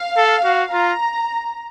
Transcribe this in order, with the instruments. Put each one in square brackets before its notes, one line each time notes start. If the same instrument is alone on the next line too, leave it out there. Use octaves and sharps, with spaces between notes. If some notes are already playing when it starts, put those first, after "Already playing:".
Already playing: [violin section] F5
[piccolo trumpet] A4
F#4
[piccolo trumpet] F4 [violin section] A#5